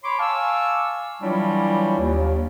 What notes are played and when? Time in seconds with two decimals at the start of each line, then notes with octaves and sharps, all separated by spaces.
0.04 C#5 B5 C6 D6
0.19 F5 G#5 A5 C#6 D6 E6
1.22 E3 F#3 G3 D4 E4 F4
1.99 D#2